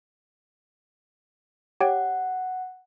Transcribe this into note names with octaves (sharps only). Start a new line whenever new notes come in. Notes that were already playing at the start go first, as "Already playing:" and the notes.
G4 C#5 F#5 G5